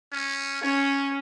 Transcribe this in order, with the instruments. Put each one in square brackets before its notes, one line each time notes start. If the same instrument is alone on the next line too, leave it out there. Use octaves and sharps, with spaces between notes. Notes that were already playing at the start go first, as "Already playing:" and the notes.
[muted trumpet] C#4
[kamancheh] C#4 [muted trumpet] C#5